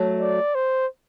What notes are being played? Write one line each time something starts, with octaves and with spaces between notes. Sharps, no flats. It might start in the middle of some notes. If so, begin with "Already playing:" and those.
Already playing: F#3 A3
D5
C5